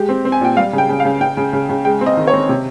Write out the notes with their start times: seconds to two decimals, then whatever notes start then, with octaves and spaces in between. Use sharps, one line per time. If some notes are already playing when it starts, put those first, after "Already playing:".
Already playing: G#3 G4
0.09 C4
0.25 C4
0.32 G#5
0.41 A#2 G5
0.57 G3 F5
0.73 C#3
0.78 G5
0.89 C#3
1.00 F5
1.05 C#3
1.21 C#3 G5
1.37 C#3
1.53 C#3
1.69 C#3
1.85 G#3 G5
2.01 C4
2.06 D#5
2.17 D#3
2.27 C#5
2.33 C4
2.49 C3